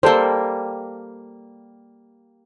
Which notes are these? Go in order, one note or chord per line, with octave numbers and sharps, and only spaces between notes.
G3 A#3 A4 C5